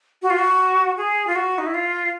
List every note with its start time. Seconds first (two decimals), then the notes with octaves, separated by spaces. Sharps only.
0.22 F#4
0.30 F4
0.38 F#4
0.97 G#4
1.27 F4
1.36 F#4
1.58 D#4
1.66 E4
1.74 F4